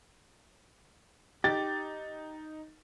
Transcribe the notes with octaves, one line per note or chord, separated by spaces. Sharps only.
D#4 G4 A6